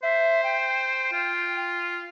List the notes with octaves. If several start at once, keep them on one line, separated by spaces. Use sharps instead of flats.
C5 E5
G5
F4